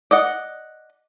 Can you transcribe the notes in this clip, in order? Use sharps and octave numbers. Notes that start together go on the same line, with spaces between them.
D5 D#5 F#5